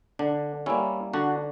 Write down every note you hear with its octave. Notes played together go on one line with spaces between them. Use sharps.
D3 D4
G3 A#3 C#4 E4
D3 D4 F#4